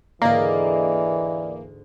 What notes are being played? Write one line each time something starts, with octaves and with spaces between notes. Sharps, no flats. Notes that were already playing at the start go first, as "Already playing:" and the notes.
D2 G#2 D3 E3 A#3 D5 D#5